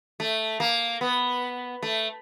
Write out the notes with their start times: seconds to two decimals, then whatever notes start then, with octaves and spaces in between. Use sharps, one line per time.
0.20 A3
0.60 A#3
1.01 B3
1.82 A3